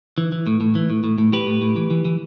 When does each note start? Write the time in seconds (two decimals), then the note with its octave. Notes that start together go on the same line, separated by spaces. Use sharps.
0.18 E3
0.32 E3
0.47 A2
0.61 A2
0.75 E3
0.90 A2
1.04 A2
1.18 A2
1.32 A2 G4 B4
1.47 A2
1.62 A2
1.76 E3
1.91 E3
2.05 E3